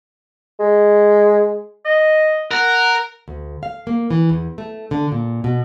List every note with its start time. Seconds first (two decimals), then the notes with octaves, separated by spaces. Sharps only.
0.60 G#3
1.86 D#5
2.51 A#4 F#5
3.28 D2
3.63 F5
3.87 A#3
4.11 E3
4.29 E2
4.58 A3
4.91 D3
5.12 A#2
5.44 B2